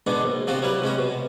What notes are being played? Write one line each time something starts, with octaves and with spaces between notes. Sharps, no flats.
B2 D3 G#3 B3 D4
A#1
C3 F3 C4 F4 F#4
F#3 G3 E4 B4
C3 G#3 C#4 F#4
B2